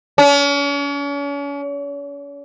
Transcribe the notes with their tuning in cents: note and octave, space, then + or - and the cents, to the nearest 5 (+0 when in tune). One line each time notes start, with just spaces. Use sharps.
C#4 +40